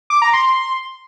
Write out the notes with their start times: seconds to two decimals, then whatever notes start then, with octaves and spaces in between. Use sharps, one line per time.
0.10 D6
0.22 A#5
0.33 C6